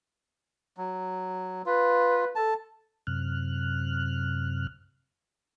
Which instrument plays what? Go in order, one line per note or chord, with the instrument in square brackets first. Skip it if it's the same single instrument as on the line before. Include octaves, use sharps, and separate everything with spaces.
[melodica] F#3
[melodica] F4 [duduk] B4
[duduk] A4 [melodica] A5
[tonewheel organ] F#2 C3 F6 F#6